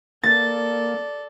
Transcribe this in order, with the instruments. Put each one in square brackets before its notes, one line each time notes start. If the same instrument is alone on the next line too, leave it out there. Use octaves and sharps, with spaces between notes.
[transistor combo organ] A#3 [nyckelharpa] A4 D5 [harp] A6